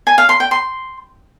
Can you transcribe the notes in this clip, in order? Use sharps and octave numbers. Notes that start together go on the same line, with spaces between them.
G#5
F5
C6
G5
C6